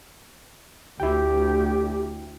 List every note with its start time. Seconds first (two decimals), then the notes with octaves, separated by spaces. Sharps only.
1.00 D2 E4 G4 G5